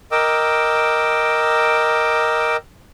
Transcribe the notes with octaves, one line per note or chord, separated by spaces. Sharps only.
A#4 D#5 G5 D6 E6